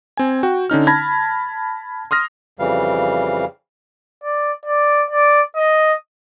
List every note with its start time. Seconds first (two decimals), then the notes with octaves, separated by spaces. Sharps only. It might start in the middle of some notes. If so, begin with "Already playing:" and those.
0.17 C4 G#5
0.43 F#4 G5
0.70 D3 C#4 D#4 F6
0.87 A5 B5 G#6 A#6
2.11 C6 D#6 F6 A#6
2.59 F2 C#3 E3 G3 F5
4.24 D5
4.66 D5
5.11 D5
5.56 D#5